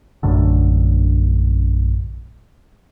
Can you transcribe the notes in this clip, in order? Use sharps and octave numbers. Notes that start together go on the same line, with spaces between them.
A#1 F#2 A2 D3